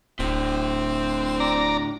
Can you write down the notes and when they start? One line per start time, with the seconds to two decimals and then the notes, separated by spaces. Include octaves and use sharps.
0.19 D1 A2 D3 C4
1.40 D5 A#5